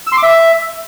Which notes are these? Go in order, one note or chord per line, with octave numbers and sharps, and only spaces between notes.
E6
C6
D6
E5